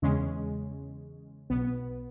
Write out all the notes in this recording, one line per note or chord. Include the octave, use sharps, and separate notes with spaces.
E2 C#3 G#3 C#4
B1 B2 B3